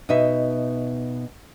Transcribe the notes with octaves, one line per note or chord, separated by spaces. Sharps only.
B2 D#4 E5